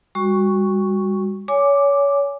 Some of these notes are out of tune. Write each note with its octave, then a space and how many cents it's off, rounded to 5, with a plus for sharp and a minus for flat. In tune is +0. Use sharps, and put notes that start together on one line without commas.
G3 +35 F#4 +0 C#6 +0
C#5 +25 G#5 +0 D6 +0